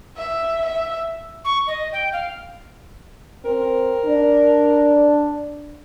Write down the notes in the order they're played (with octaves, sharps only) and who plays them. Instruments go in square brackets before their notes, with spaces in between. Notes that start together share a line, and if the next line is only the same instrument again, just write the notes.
[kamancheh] E5
E5
[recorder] C#6
D#5
G5
F5
[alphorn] C4 [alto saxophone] A#4
[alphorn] D4